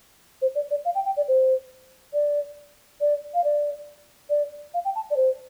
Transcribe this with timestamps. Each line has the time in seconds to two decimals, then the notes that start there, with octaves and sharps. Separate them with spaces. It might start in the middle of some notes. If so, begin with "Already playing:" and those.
0.42 C5
0.55 D5
0.71 D5
0.85 F5
0.95 G5
1.05 G5
1.17 D5
1.28 C5
2.13 D5
3.01 D5
3.34 F5
3.44 D5
4.30 D5
4.74 F5
4.85 G5
4.95 A5
5.10 D5
5.16 C5